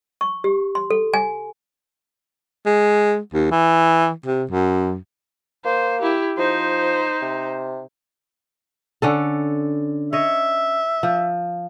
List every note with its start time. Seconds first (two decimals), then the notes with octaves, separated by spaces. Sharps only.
0.21 C#6
0.44 G4
0.75 C6
0.90 A4
1.14 G#5
2.66 G#3
3.34 D#2
3.51 E3
4.26 C3
4.51 F#2
5.65 A#3 C5
6.02 E4 G4
6.37 F3 D#4 C5
7.22 C3
9.02 D3 C#4 A4
10.13 C#5 D#5 E5
11.03 F3